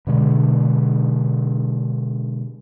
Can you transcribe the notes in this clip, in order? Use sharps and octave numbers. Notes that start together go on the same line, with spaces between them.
B2 D3 G#3